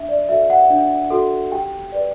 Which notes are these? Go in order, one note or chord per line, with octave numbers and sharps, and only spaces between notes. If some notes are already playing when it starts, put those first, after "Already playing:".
Already playing: D4 E5
D5
F#4 A4 E5
F#5
D4
F#4 A4
G4 G5
B4 D5